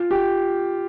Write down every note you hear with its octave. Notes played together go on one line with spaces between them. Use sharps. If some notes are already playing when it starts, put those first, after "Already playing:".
Already playing: F4
G4